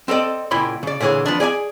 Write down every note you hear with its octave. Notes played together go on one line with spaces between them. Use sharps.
C4 A4 A#4 D5 D#5
C#2 A#2 E4 B5 C6
C#3 D5
A#2 D3 E3 G#4 C#5
F3 B3 D4
G#4 D5 D#5 G#5